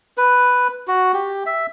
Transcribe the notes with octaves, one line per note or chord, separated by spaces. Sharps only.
B4
F#4
G4
E5